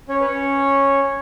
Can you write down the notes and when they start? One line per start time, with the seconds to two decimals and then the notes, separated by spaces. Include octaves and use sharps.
0.08 C#4 C#5
0.20 B4
0.26 C#4 C#5